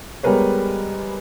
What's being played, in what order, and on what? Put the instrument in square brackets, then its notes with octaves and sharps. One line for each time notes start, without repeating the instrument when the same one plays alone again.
[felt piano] G3 G#3 B3 A#4 B4 C#5